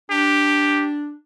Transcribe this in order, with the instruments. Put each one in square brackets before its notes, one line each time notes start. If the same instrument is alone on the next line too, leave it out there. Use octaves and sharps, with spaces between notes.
[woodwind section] D4 [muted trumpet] G4